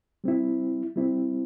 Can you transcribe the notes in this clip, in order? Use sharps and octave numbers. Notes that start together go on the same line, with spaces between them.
G3 C4 E4
G3 C4 E4